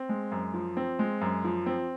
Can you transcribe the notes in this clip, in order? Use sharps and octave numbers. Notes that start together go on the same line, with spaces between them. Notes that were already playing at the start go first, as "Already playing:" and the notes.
Already playing: C4
G#3
F#2
F3
C4
G#3
F#2
F3
C4